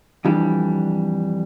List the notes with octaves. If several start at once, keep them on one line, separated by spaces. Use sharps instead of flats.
F2 E3 G3 D4